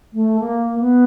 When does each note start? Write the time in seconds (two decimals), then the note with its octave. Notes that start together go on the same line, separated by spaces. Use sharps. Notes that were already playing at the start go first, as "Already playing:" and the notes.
0.13 A3
0.40 A#3
0.80 B3